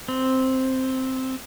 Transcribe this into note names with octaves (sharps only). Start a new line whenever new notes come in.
C4